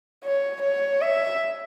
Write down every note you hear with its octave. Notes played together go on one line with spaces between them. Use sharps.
C#5
C#5
E5